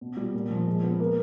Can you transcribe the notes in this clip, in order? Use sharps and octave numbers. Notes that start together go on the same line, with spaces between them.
B2
G3
A#2
F3
G#3
B3
A#3